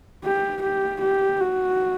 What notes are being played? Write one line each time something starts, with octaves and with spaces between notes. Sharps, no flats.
G4
G4
G4
F#4